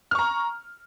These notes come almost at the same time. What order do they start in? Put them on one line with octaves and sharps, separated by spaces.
F6 C#6 A#5